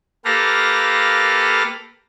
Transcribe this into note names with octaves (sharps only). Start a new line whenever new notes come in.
A#3 G4 A4 B4 F5 A#6